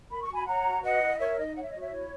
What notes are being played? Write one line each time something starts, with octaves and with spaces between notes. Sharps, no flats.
A#4 B5
C#6
F#4 G#5 B5
C#5 F#5 A#5
F#4
B4 D#5 F#5
E4
A#4 C#5 E5
D#4 D#5
C#5 F#5
E5
F#4 D#5
C#5 E5
E4 C#5